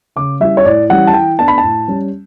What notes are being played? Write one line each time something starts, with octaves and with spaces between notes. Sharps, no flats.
C#3 D6
G3 C#4 E4 E5
C#5
A2 D5
E3 G3 C#4 F#5
A5
E3 G5
B3 D4 A5
B5
A5
A2
G3 C#4